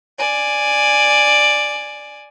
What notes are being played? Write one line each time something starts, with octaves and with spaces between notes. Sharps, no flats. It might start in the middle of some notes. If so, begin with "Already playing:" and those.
D5 G#5